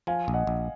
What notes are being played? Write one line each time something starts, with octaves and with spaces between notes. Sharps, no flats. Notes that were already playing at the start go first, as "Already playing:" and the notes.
F3 F5 G#5
A#1
D#5 F#5
A#1